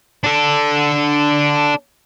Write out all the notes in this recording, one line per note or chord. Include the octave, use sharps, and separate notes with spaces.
D4 A4